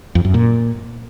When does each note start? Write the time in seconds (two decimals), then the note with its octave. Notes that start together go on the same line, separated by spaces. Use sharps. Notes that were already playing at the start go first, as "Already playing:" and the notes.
0.15 F2
0.25 F#2
0.34 A#2